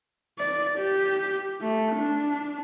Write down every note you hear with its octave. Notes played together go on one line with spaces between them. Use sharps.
D5
G4
A3
D4